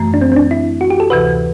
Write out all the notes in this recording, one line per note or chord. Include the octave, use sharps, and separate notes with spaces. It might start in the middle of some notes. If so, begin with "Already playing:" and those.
Already playing: F#2 E3 A3
D4
C4
C4
D4
E4
F#4
G4
A4
D2 C3 E3 B4